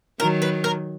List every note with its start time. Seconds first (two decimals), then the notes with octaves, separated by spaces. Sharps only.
0.20 D#3 F#3 A#4
0.42 B4
0.64 A#4